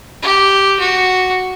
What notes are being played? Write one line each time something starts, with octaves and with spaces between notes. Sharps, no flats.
G4
F#4